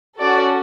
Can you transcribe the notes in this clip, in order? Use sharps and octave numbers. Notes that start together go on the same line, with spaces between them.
C#4 F#4 A4 D5